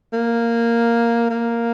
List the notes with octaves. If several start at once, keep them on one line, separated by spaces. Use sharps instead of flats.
A#3
A#3